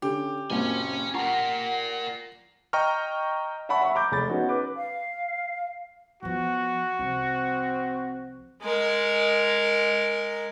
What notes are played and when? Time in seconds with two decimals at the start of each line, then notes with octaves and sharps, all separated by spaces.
0.02 D3 C#4 G4
0.50 F#1 A#2 C4 C#4 G#5
1.15 F4 A#4 F#5 A5 A#5 C#6
2.73 D#5 G5 A#5 C#6 F6
3.69 E5 F#5 A5 B5 C#6
3.82 E5 B5 C#6
3.95 A#5 D6 G6
4.11 F1 G#3 B5 A6
4.30 B3 C#4 D#4 F#4
4.49 B4 D6
4.77 F5
6.23 F2 F3 B3 F#4
6.99 C2 F3 C4
8.62 G#3 A#4